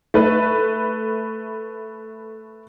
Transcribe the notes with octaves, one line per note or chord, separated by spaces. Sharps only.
A3 B4